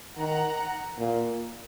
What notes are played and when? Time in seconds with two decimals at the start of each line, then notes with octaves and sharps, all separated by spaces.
0.18 D#3 F#5 A#5
0.98 A#2